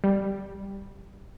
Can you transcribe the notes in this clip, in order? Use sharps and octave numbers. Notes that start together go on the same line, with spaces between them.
G3